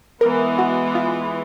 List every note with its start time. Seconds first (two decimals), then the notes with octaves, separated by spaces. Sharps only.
0.21 E3 G#3 B3 A#4
0.58 F#4
0.95 F4